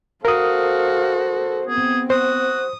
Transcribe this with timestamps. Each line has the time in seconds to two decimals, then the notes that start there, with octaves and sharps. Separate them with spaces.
0.25 F#4 A4 A#4 C5 F5 D#6
1.68 B3 C4 G#4
2.10 F#4 C5 D#6